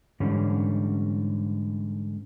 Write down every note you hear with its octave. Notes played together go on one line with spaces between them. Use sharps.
G#2 D3 E3 G3 C#4